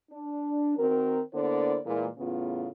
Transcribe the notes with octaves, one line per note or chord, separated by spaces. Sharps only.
D4
D#3 C4 F#4 A#4
D3 A#3 B3 E4 C5 D5
A#2 E3 G#3
E2 A2 C#3 B3 F4